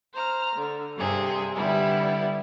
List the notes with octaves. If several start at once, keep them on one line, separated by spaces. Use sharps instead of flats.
C5 A#5 F6
D3
G2 C3 C4 G#4
D3 G3 B3 E4